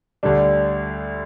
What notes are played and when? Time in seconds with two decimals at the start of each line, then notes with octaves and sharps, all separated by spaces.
0.23 D2 D3 G3 D4